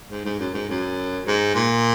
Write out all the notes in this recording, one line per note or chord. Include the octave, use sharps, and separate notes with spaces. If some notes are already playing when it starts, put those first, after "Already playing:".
G#2
G#2
F#2
G#2
F#2
G#2
A#2